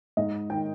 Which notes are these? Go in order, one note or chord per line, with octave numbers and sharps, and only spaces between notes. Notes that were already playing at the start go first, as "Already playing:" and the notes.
G#2 D#5
D#3 G5